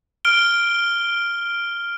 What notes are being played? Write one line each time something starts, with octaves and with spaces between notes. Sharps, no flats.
F6 D7 G7